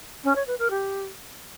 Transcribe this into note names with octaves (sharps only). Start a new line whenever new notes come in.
C#4
C#5
B4
A#4
G4